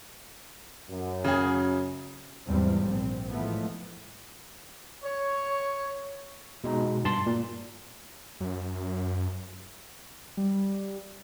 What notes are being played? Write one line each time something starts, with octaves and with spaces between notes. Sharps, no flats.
F#2
C#3 G#4
E2 G#2 F3 G3 C4
A#1 C4
A2 E3 F3 G#3 A3 B3
C#5
B2 G#3 D#4
G2 A5 C6
A#2
F#2
G3